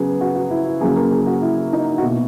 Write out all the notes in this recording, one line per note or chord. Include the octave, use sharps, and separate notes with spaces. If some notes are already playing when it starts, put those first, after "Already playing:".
Already playing: C#3 F#3 B3 G#4
F#4
F#4
E4
E4
C#3 F#3 A#3 G#4
A#4
G#4
F#4
E4
D#4
F#4
B2 A#3 E4